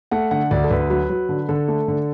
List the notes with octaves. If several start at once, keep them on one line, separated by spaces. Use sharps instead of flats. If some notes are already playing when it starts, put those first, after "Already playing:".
A3 F#5
D3 F#5
D2 D5
A4
D2 B4
F#3 B4
F#3
D3
D3 A4
A3
D3